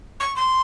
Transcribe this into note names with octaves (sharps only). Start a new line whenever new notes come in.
C#6
C6